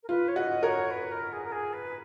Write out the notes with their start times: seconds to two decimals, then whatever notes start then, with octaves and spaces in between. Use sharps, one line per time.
0.03 A#4
0.08 F4 B4
0.28 C#5
0.35 F#4 D#5
0.63 F#4 A#4 C#5
0.90 B4
1.11 A#4
1.32 G#4
1.44 A#4
1.51 G#4
1.73 B4